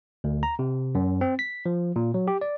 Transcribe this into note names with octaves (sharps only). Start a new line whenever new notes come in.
D2
A#5
C3
F#2
C4
B6
F3
A#2
F#3
G4
D5